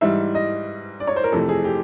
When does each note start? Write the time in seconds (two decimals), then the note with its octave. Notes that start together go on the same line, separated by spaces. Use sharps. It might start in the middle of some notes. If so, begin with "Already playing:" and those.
0.01 G#2 E3 G3 E5
0.35 D#5
1.00 D5
1.07 C#5
1.16 C5
1.24 A#4
1.32 F2 C3 E3 A3 A4
1.49 G#4
1.64 G4